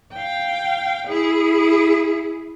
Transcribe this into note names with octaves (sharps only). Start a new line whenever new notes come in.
F5 G5
E4 G#4